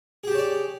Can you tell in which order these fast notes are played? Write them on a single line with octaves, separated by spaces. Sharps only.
G#4 G4 A5 C#5 D5